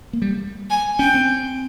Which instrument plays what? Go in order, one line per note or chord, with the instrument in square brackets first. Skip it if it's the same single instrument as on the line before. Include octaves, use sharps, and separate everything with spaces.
[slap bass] A#3
G3
[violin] G#5
[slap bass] C#4 [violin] G5
[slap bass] C4